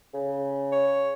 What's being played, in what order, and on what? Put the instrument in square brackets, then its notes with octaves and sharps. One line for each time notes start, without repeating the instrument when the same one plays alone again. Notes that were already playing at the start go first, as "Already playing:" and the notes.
[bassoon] C#3
[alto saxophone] C#5